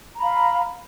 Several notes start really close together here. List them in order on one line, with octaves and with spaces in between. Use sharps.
A#5 B5 F5